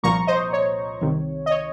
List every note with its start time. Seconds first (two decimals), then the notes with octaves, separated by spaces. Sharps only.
0.03 C2 A#2 F3 A#3 A#5 C#6
0.27 C5 D#5
0.53 C#5
1.01 C2 C3 D#3
1.46 D#5
1.51 C#5